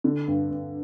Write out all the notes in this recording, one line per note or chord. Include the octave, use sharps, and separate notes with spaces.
D3
G2
G2